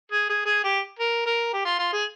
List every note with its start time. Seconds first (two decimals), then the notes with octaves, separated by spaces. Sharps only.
0.12 G#4
0.29 G#4
0.46 G#4
0.64 G4
0.99 A#4
1.26 A#4
1.53 G4
1.65 F4
1.79 F4
1.93 G#4